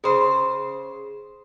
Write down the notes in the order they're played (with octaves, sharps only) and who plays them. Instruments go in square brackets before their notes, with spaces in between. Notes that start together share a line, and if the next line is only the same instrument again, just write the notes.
[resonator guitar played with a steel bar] C#3 C5 [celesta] G#4